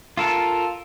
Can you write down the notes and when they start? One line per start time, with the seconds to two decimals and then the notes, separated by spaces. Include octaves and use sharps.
0.17 F4 A4 A#4